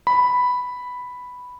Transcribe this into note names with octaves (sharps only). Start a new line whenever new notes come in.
B5